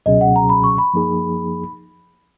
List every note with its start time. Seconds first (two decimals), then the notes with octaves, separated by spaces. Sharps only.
0.06 C#2 B2 F#3 C#4 G#4 D#5
0.21 F#5
0.36 A#5
0.49 B5
0.64 C#6
0.78 B5
0.94 F#2 F3 A#3 D#4 G#4